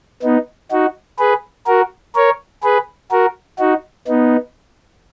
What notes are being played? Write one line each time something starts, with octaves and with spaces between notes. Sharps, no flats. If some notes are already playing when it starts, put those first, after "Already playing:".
B3 D#4
D#4 F#4
G#4 B4
F#4 A#4
A#4 C#5
G#4 B4
F#4 A#4
D#4 F#4
B3 D#4